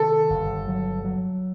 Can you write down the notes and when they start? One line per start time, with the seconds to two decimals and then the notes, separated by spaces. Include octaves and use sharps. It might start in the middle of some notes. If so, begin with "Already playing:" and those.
Already playing: C3 D#3 A4
0.30 G1
0.68 F#3
1.04 F#3